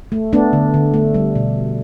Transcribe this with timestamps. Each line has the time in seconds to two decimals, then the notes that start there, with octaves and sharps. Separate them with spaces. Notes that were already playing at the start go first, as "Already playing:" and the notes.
0.12 A3
0.33 A3 B3 D4
0.53 D3
0.74 D3
0.94 A3
1.14 G3
1.35 B2